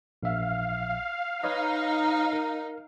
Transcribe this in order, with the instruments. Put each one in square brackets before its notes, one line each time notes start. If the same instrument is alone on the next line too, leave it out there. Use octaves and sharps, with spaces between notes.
[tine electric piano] A#1 E5 [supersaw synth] F5
[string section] D#4 [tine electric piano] B4 C#5 D#5
[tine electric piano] A#4